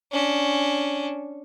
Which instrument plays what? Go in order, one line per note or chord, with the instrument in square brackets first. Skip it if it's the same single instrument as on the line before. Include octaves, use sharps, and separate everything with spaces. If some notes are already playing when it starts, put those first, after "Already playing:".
[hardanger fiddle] C#4 D4